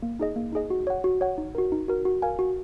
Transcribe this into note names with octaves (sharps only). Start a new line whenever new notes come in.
A#3
D#4 G#4 D#5
A#3
D#4 G#4 D#5
F#4
C#5 F#5
F#4
C#5 F#5
D#4
F#4 A#4
D#4
F#4 A#4
F#4
A#4 F5 G#5
F#4